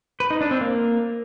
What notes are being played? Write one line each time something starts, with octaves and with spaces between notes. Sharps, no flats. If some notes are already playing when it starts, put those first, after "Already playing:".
B4
D#4
D4
C4
A#3